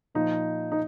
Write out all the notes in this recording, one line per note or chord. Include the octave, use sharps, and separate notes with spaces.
A#2 F3 D#4
D#4